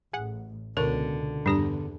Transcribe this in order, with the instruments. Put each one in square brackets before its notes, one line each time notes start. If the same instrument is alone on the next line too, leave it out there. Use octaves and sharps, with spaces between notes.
[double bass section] A1 [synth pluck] G#4 F#5
[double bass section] C#2 B2 [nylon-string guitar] D3 [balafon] A#4 [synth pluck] C#5
[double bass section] E2 [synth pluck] G2 A#5 A#6 [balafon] D4 G4